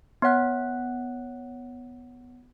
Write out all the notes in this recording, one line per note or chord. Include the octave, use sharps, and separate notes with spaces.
B3 C#5 F#5 F#6